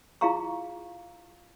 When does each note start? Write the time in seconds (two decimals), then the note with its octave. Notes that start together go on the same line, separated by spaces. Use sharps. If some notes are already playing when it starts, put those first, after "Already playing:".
0.21 E4 F4 G#4 F5 A#5 C#6